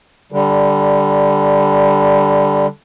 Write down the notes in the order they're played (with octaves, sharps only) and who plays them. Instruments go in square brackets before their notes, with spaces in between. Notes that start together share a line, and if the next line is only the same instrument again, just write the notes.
[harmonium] D3 G3